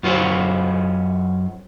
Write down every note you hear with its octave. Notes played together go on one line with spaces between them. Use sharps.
F#2 F4 C5 C#5